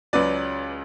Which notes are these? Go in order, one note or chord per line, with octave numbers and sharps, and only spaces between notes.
C#2 C#3 F#3 B4 D5